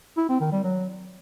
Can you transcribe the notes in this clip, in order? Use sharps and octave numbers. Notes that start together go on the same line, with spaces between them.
E4
C4
D#3
G3
F#3